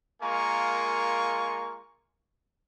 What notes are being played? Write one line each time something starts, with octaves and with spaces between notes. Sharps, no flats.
G#3 A#3 F4 A#4 G#5 C#6